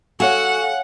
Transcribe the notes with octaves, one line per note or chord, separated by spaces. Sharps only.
F#4 A4 C#5 F5 F#5 G#5